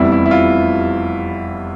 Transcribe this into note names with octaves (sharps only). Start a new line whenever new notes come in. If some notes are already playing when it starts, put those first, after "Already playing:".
Already playing: F1 E2 C3 G3 E4
E4
E4
F4